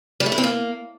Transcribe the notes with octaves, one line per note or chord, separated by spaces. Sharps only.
G3
A3
E4
C4
A#3